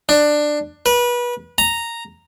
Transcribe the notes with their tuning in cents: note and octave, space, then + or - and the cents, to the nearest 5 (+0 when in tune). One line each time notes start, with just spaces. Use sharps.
D4 +15
B4 -30
A#5 -5